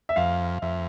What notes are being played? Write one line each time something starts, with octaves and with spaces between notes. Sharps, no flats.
E5
F2 F5
F2 E5